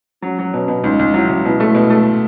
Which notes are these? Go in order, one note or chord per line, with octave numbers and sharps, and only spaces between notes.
F#3 C#4
F#3
B2 C#4
B2
C#2 D#4
C#2
F#3 E4
C#2
B2 E4
A3
B2
A3